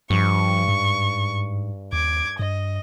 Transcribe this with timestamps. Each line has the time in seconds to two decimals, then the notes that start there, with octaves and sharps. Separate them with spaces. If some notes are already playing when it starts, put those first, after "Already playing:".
0.10 G2 F3 C#6
0.68 G#2
1.93 D#2 D6 G#6
2.39 G2 D#5